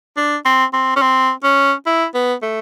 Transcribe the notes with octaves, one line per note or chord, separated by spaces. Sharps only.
D4
C4
C4
C#4
C4
C#4
E4
B3
A3